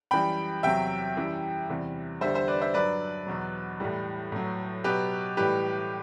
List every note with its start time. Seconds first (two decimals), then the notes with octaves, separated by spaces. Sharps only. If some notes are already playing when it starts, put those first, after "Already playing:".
0.11 F#2 E3 G3 G5 B5
0.63 E2 C3 F#3 E5 G5
1.16 F#2 E3 G3
1.69 E2 C3 E3 G3
2.21 E2 D3 G3 C5 E5
2.35 C5 E5
2.48 B4 D5
2.61 C5 E5
2.74 G2 F#3 B4 D5
3.27 E2 B2 F#3
3.80 A2 E3 G3
4.32 A2 F#3
4.84 B2 F#3 G4 B4
5.37 A2 E3 G3 G4 B4